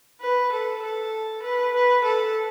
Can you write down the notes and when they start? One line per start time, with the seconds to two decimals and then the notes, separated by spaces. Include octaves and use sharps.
0.21 B4
0.52 A4
0.82 A4
1.43 B4
1.74 B4
2.04 A4